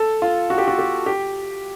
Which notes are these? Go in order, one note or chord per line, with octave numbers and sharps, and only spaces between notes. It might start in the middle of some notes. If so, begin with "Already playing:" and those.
Already playing: A4
F4
F#4
G4
F#4
G4
G4